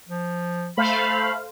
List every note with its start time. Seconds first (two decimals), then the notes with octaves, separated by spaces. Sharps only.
0.09 F3
0.77 A3 C5 F5 B5